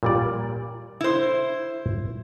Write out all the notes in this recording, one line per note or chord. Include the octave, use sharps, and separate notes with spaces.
A#2 G3 D5
E4 C5